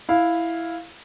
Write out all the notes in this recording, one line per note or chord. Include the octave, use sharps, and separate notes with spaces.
E4 F5